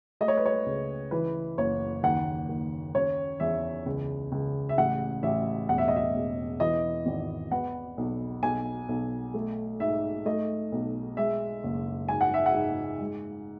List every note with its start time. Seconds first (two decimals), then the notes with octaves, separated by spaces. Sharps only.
0.21 A3 D#5
0.28 C#5
0.37 B4
0.46 C#5
0.66 C#2
1.11 E3 B4
1.58 F#1 C#5
2.03 D#2 F#5
2.49 D#2
2.95 C#4 C#5
3.40 E2 E5
3.86 C#2
4.32 C#2
4.69 E5
4.77 A1 F#5
5.23 A1 E5
5.69 E1 F#5
5.78 E5
5.88 D#5
5.96 E5
6.14 E1
6.60 E3 D#5
7.06 G#1
7.51 B3 F#5
7.98 B1
8.43 B1 G#5
8.89 B1
9.34 A3
9.80 G#2 E5
10.25 A3 D#5
10.72 B1
11.17 G#3 E5
11.64 F#1
12.08 G#2 G#5
12.21 F#5
12.34 E5
12.46 F#5
12.54 G#2
13.00 G#3